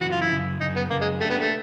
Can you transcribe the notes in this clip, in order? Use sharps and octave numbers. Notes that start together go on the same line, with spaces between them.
F#2 C#3 E3 F#4
F4
E4
F#2 C#3
F#2 C#3 D#4
B3
F#2 C#3 A#3
G#3
A3 A#3 D4 G4
B3
A3